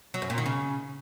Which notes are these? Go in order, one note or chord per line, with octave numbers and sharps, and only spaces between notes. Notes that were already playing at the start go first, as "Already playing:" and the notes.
F#3
F#2
A#2
D#3
C#3